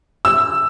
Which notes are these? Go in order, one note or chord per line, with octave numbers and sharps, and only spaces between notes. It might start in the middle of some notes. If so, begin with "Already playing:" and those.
E6